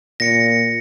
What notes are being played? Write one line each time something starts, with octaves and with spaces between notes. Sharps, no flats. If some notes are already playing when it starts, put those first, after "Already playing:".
A#2 A#6 C#7